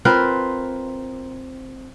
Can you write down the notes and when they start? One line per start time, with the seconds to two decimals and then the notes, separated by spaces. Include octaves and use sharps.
0.05 C4 F4 A#4 B4